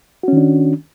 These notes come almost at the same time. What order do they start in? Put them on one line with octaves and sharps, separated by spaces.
F#4 C#4 D#3 D4